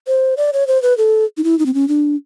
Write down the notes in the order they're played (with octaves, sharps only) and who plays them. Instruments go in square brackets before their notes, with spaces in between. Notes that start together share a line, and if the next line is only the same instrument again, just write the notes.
[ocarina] C5
D5
C#5
C5
B4
A4
D#4
E4
D#4
C4
C#4
D4